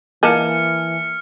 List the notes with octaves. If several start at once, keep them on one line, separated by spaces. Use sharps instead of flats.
E3 A#3 D#5 G#5 A5 F6 C#7